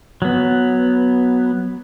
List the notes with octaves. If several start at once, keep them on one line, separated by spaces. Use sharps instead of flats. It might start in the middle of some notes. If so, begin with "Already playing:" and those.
F#3 B3